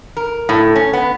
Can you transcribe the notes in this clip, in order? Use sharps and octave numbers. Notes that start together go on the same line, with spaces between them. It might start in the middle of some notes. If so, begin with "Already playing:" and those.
A#4
A2
C#4
B3